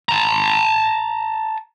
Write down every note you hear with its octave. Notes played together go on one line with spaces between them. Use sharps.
A5 A#5